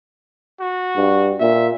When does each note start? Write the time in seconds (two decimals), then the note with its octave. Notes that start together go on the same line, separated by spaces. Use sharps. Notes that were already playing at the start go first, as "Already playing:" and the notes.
0.61 F#4
0.96 G2
1.40 A#2 E5